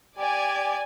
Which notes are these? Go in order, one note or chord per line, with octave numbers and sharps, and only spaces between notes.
G4 D5 G#5